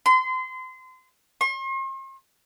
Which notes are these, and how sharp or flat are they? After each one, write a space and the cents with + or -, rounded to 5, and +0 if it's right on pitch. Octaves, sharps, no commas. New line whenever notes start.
C6 -30
C6 +45